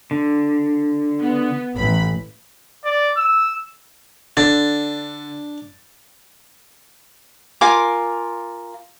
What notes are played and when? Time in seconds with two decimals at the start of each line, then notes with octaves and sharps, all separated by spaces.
0.11 D3
1.19 B3
1.74 A1 B5
2.85 D5
3.17 E6
4.37 D3 D4 A6
7.61 F4 A#4 G#5 D6